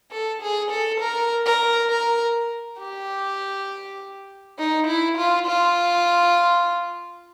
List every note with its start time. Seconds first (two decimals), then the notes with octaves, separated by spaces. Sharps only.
0.12 A4
0.42 G#4
0.71 A4
1.01 A#4
1.46 A#4
1.90 A#4
2.80 G4
4.59 D#4
4.87 E4
5.18 F4
5.47 F4